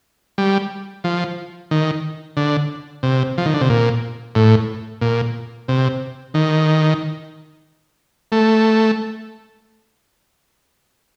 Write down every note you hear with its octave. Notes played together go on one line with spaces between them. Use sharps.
G3
F3
D#3
D3
C3
F3
D#3
D3
C3
A#2
A2
A#2
C3
D#3
A3